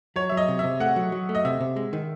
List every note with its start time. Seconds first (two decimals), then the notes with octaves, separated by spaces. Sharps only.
0.16 F#3 C#5
0.29 F#3 E5
0.37 D#5
0.48 C3
0.59 C3 E5
0.80 A3 F#5
0.96 F#3
1.12 F#3
1.29 A3
1.35 D#5
1.45 C3 E5
1.61 C3
1.76 G#3
1.93 D#3